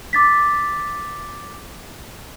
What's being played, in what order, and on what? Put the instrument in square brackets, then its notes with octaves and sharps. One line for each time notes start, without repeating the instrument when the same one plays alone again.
[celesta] D6 A6 B6